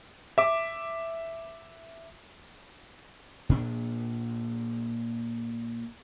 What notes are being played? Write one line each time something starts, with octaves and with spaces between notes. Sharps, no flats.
E5 D6
A#2 D4